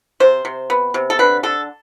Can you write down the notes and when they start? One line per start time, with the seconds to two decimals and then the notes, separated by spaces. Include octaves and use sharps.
0.20 C3 C5
0.45 C3
0.70 B3
0.94 C3
1.10 A4
1.19 D3 B4
1.43 D3 A4